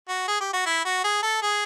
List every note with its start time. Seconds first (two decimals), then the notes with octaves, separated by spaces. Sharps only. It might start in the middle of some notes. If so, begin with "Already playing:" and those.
0.09 F#4
0.28 G#4
0.41 G4
0.53 F#4
0.66 E4
0.85 F#4
1.04 G#4
1.23 A4
1.42 G#4